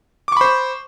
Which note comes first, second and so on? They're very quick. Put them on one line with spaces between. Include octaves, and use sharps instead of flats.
D6 C#6 B5 C5